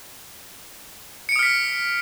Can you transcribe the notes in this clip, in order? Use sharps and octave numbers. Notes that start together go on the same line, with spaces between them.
D#6 F6 B6 C#7 D7